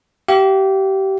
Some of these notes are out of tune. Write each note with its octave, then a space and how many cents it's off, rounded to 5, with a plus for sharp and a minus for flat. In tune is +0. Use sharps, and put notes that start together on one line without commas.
G4 -25 F5 -40